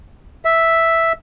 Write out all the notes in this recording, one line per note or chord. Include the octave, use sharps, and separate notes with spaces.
E5